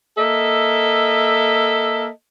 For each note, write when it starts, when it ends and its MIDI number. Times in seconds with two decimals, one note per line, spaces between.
0.18 2.09 58
0.18 2.09 69
0.18 2.09 75
0.18 2.09 76